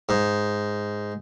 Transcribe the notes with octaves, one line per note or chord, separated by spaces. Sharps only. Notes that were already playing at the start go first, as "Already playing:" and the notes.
G#2